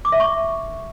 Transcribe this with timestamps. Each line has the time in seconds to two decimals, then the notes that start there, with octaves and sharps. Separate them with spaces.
0.05 D6
0.12 E5
0.20 C#6